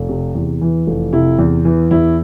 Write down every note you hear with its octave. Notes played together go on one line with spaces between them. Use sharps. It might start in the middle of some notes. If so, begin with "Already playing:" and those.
Already playing: F1
C3
E2
E3
F1
C3 E4
E2
E3
E2 E4